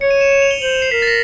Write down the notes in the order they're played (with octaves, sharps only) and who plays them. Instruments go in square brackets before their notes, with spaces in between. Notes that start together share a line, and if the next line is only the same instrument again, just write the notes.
[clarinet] C#5 [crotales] C#7
[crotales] D#7
E7
E7
F7
G7
[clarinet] C5 [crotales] F#7
[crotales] F7
C7
[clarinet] A#4 [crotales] B6
[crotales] A6
A#6